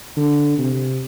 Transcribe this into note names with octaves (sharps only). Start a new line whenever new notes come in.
D3
C3